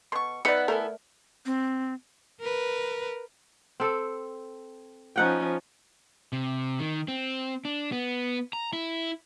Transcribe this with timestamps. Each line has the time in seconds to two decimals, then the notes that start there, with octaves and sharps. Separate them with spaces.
0.12 B2 C6 C#6
0.45 B3 D#4 B4 D5 E5 F#5 C#7
0.68 A3 E4 A4 A#4 G#5
1.46 C4
2.41 A#4 B4
3.80 C4 A4
5.16 F3 C#4 D#4 F#5 G5
6.33 C3
6.79 D#3
7.08 C4
7.65 D4
7.92 B3
8.53 A#5
8.73 E4